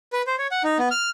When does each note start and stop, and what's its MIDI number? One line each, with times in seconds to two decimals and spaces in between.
0.13 0.22 71
0.27 0.35 72
0.38 0.47 73
0.51 0.63 78
0.64 0.78 63
0.79 0.89 59
0.91 1.10 89